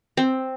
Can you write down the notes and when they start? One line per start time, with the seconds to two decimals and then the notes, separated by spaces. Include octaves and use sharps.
0.17 C4